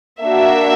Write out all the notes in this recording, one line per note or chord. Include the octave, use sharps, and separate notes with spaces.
A#3 D4 F#4 E5